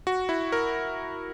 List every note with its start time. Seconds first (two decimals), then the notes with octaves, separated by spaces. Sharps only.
0.07 F#4
0.29 E4
0.52 A#4